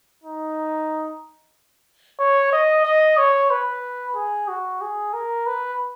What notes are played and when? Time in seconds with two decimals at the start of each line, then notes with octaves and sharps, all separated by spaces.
0.24 D#4
2.20 C#5
2.53 D#5
2.85 D#5
3.18 C#5
3.50 B4
4.16 G#4
4.48 F#4
4.81 G#4
5.14 A#4
5.46 B4